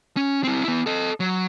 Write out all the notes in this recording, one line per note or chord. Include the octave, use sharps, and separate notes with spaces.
C#4
C4 E4
B3 E4
A4 D#5
F#3